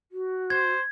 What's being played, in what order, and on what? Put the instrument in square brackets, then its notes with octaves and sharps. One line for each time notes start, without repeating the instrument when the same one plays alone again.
[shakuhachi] F#4
[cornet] C5 [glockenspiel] G#6